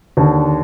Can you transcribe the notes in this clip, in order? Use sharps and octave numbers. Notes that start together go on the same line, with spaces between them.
D#2 D3